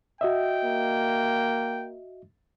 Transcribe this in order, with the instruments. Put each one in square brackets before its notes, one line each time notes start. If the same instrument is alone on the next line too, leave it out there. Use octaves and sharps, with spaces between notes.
[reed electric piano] F#4 D#5 E5 [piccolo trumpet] G5
[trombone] A#3